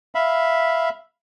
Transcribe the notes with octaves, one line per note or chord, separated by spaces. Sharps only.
E5 F5 B5